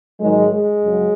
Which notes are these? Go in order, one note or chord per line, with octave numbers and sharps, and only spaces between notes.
G#2 D#3 F#3 G#3
G#3
F#2 C#3 F#3